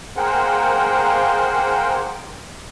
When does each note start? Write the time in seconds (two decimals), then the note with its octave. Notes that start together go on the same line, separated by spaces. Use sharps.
0.17 A#3 G#4 A#4 C5 F#5 G5